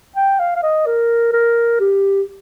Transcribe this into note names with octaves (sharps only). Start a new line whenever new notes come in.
G5
F5
F5
D#5
A#4
A#4
G4